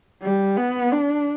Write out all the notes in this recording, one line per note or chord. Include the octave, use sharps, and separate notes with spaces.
G3
B3
D4